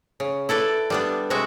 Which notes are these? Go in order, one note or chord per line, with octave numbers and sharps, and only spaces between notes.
C#3
E4 A4 B4 D5
G3 B3 D4
C3 G#3 F#4 E5